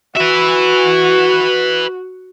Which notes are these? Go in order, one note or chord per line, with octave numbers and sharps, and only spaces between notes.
F#4 B4 E5